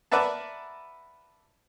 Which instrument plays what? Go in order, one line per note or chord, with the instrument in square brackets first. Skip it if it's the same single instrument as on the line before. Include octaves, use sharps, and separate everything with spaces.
[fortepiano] A#4 B4 D5 E5 F#5 A5